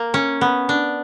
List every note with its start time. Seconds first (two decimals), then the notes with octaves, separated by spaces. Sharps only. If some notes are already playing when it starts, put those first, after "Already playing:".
Already playing: A#3
0.14 C#4
0.41 B3
0.69 D4